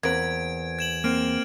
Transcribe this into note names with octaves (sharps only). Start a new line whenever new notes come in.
E2 A#3 C4 B4 G#6 D7
G#6 E7 F#7
A#3 C4 F6 D7